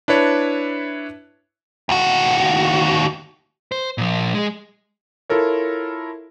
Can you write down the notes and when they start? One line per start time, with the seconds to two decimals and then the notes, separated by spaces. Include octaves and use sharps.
0.08 D4 E4 B4 C#5 A5
1.89 D#2 F#4
3.72 C5
3.98 A#2 F3
4.34 G#3 G#4
5.30 E4 F4 A4 A#4 C#5